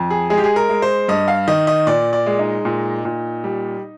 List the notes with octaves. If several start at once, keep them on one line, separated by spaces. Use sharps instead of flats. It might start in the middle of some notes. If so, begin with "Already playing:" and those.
Already playing: F2
G#4
G#3 G#4
G4
G#4
A#4
G#3
C5
G2 D#5
F5
D#3 D#5
D#5
A#2 D5
D5
G#3
D#4
A#2
A#2
G3